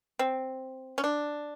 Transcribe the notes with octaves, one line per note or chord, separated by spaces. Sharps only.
C4
C#4
D4